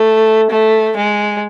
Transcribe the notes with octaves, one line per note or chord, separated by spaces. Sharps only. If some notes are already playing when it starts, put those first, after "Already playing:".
Already playing: A3
A3
G#3